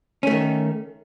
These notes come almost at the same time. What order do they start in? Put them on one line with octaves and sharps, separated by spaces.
C#4 A3 D#3